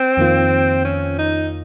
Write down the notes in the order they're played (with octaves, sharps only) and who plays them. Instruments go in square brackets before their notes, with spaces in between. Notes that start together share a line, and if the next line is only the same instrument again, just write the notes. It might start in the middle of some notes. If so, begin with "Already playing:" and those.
Already playing: [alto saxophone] C4
[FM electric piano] F2 D#3 A#3 F4
[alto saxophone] C#4
D#4